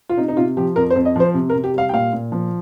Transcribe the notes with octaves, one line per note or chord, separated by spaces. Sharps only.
F4
C3 D#4
D#4
C3 F4
F3 G4
F2 A#4
C5
F2
D#5
F3 C5
C3
A#4
C3
G4
G3 F5
G5
A#2 F5
A#2
F3